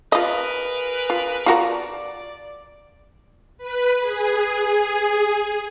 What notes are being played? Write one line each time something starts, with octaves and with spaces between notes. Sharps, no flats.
F4 G#4 A#4 B4 D#5
F4
F4 F#4 A#4 D5
B4
G#4